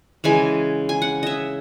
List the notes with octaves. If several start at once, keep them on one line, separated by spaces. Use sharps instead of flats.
C#3 E3 G#3 G#5
G#5
F#5
D#5 E5